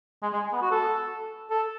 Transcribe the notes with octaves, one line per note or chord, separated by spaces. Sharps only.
G#3
G#3
B3
F#4
A4
A4